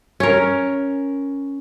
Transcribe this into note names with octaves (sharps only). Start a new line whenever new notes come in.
C#4 A#4